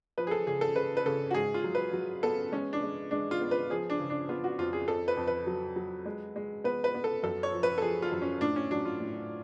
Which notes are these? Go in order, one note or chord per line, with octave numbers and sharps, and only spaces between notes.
F3 B4
G#4
A4
C#3 G#4
A4
C#3 B4
B4
C#3 A4
F#4
G#2 G#4
F4
F#3
B4
F#3
B3 A4
G#3 C#4
D4
G#3
G#3 D4
F4
B3
B4
F3 G#4
D4
C#3
D4
B3 F4
F#4
F2 F4
G#4
F2 A4
B4
F2
B4
F#3
F#3
G#3
G#3
B3 B4
B4
B3
A4
F#2 A4
C#5
F3
B4
A4
F3 G#4
F4
F#2
C#4
A2 D4
C#4
F#3 D4
F4
A2